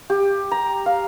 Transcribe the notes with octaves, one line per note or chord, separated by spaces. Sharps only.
G4
A#5
F5